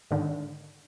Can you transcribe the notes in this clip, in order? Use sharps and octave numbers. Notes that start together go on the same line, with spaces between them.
G#2 D3 D#3